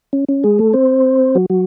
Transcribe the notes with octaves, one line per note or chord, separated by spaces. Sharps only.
C#4
C#4
G#3 G#4
A3 A4
C4 C5
F#3 F#4
F#3 F#4